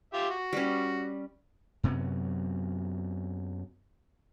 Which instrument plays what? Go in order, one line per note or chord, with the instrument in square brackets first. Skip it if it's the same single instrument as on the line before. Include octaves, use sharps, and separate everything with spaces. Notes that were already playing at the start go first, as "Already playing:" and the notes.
[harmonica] F4 G4 E5
F#4
[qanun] G3 C#4
[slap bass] F#2 C3 F#3 B3